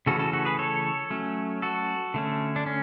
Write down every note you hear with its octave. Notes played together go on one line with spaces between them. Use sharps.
C#3 E3 A3 C#4 F#4 A4
F#4 A4
F#4 A4
G#4 B4
A4 C#5
F#3 A3 C#4
F#4 A4
D3 A3 C#4
D4
C#4